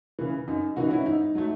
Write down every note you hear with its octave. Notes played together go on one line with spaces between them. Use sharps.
C#3 E3
F#2 D#4
C#3 E3 D#4 F#4
C#4 E4
G#2 D#4
F#3 A3